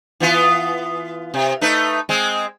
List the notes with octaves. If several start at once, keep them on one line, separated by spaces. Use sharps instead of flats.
E3 B3 F4
C3
A3 D#4 B4
G#3 C4